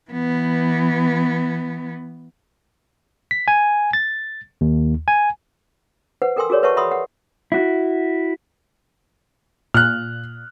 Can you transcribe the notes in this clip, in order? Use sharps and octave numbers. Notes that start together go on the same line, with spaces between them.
E3 B3
B6
G#5
A6
D#2
G#5
B4 C5 F#5
A4 A#4 G5 G#5 C6 E6
F#4 G#4 A#4 C#5 D5
B4 C#5 E5 F#5 A5 C#6
E5 F#5 B5 C6 D#6 E6
F#5
E4 F#4
A#2 F6 F#6